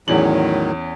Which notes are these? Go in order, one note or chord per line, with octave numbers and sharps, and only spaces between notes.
E2 A2 D#3 F#3 C#4 F#7